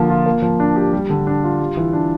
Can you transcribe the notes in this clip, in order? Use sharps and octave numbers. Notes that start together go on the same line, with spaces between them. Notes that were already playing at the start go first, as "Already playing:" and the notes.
Already playing: D3 F3 A#3
F4
A#3
F3
D4
G4
G3
D3
D4
F4
G3
E3
D4